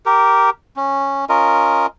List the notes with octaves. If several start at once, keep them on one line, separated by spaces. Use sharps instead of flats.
G4 A#4
C#4
C#4 F4 A#4 D#5